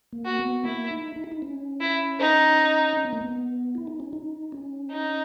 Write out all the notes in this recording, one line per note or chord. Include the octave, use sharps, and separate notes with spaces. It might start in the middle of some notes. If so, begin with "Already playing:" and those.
A#3
F#4
B3
A#3 E4
D#4
D#4
E4
D#4
C#4
E4
D#4
C#4
B3
A#3
B3
E4
D#4
C#4
D#4
C#4
D#4